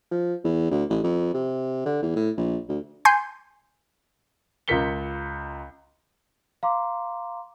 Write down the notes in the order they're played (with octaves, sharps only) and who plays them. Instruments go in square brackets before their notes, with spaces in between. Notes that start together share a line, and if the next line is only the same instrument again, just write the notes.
[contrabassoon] F3
E2
D2
A1
F2
C3
D3
E2
A2
A#1
D2
[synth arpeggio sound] G#5 C6 G6
[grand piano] C#2 F4 A#4 B6 C#7 G7
[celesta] F5 A#5 C6 D6